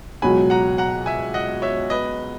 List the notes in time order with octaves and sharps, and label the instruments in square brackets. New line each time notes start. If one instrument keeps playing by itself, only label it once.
[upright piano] C#2 B2 F#3 [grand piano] G#5 B5
[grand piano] F#5 A#5
F#5 A#5
E5 G#5
D#5 F#5
C#5 E5
B4 D#5